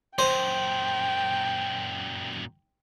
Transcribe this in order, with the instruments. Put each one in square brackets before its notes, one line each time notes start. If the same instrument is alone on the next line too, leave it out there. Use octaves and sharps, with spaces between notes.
[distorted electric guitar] F#2 A#2 [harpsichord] C5 [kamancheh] G5